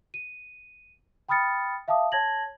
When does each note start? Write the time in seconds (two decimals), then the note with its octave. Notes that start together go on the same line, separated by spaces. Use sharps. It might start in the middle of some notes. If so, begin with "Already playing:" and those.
0.14 D#7
1.29 G5 B5 D#6 F6 A6 C#7
1.88 E5 F5 A5 D6 D#6
2.12 C#5 A5 G#6 A#6 F#7